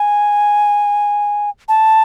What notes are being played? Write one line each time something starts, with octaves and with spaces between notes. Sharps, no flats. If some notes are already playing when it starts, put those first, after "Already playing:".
Already playing: G#5
A5